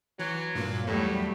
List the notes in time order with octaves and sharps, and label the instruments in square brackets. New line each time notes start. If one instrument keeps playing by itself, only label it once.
[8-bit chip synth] E3 [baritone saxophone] F#3
[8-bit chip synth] G2 A#2 A#3
[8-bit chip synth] E2 [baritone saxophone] A2 [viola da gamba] F#3 G3 A3